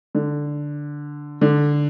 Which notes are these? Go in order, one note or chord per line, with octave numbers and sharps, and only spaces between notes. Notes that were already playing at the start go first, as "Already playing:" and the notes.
D3
D3